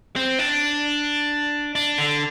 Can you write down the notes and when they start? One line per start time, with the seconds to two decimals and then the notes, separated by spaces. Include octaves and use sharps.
0.16 C4
0.39 D4
1.75 D4
1.98 D3